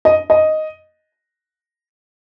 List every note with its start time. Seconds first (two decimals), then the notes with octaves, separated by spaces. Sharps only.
0.05 D#5
0.30 D#5